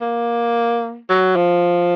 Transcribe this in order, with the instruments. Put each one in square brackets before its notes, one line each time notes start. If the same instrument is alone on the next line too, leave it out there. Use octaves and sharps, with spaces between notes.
[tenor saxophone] A#3
F#3
F3